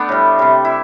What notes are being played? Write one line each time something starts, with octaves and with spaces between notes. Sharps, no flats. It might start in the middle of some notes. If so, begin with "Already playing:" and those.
Already playing: A3 B3 D4
A2 G3
C3 G3
E4